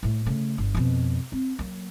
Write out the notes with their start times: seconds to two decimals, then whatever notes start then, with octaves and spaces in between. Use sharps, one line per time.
0.03 A2 A3
0.26 C#3 A3
0.58 G1
0.75 F2 B2
1.32 C4
1.59 F#3 A#3